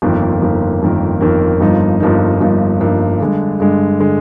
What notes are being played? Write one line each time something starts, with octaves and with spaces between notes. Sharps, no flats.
G1 F2 D#3 A#3
G1 F2 D#3 A#3
G1 F2 D#3 A#3
G1 F2 D#3 A#3
G1 G2 F3 A#3 D#4
G1 G2 F3 A#3 D#4
G1 G2 F3 A#3 D#4
G1 G2 F3 A#3 D#4
G2 D3 G#3
G2 D3 G#3
D3 G#3